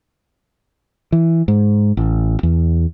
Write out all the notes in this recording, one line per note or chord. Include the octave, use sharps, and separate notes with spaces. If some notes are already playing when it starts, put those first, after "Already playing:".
E3
G#2
A1
E2